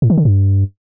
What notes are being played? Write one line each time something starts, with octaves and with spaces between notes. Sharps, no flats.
A2
D#3
D3
G2